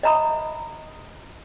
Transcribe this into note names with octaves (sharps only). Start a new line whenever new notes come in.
D#5 E5 A#5 B5 D#6